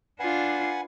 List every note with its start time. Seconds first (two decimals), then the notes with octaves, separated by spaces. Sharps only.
0.20 D4 F4 B4 F#5 G#5